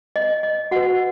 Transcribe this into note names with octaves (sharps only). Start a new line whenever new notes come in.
D#5
D#5
F#4 B4 F#5